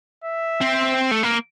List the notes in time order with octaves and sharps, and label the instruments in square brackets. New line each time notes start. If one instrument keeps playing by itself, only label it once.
[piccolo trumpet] E5
[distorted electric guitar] C4
A3
A#3